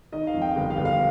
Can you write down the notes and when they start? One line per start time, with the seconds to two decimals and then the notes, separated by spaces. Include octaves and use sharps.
0.12 D#3 D#5
0.27 F5
0.34 F2
0.42 G5
0.56 G1
0.70 F5
0.77 G1
0.85 F5